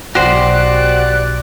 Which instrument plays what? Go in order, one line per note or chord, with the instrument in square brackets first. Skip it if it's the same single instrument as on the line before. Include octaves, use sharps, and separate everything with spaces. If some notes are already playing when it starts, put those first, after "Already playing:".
[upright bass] B1 [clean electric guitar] F#4 G4 C5 [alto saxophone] D5 [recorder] F#6